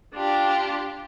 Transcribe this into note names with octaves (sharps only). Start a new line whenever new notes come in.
D4 F4 G4